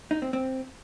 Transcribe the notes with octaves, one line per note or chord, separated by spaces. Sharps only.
D#4
C4
C4